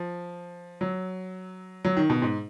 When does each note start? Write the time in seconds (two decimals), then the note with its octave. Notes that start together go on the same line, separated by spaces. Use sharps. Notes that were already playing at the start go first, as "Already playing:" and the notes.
Already playing: F3
0.81 F#3
1.85 F#3
1.97 D#3
2.10 B2
2.22 G#2